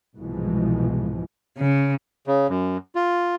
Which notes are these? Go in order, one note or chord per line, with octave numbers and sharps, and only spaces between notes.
C2 G#2 B2 E3 F3 G#3
C#3
C#3
F#2
F4